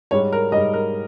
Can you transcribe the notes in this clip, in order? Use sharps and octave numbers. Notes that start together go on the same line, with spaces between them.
G#2 G3 C#5
A#4
G#2 G3 D#5
A#4